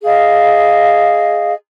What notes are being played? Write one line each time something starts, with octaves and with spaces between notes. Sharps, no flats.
G#4 D#5 F5